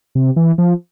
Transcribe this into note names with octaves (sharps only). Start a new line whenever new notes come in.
C3
E3
F3